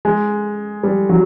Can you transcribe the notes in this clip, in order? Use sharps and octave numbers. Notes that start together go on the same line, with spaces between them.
G#3
G3
F#3